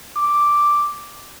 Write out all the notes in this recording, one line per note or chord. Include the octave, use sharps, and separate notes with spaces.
D6